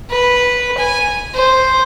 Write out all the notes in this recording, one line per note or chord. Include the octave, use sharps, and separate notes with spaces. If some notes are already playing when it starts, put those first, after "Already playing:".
B4
G#5
C5